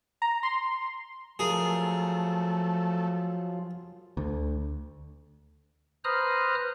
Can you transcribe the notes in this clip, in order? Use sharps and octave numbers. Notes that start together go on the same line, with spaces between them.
A#5
C6
F3 F#3 A3 F4 G#4 A#4
D2
B4 C5 A#5 D#6 F6 F#6